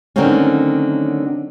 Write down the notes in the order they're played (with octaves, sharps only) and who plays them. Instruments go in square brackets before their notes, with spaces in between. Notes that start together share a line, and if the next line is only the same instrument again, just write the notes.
[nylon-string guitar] D3 D#3 F#3 A3 C4 C#4